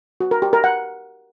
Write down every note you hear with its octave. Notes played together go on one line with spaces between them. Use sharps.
F#4
A#4
G4
A#4
F#5